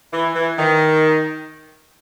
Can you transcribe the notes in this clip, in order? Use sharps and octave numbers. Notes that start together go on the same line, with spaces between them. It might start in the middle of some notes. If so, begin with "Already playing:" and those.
E3
E3
D#3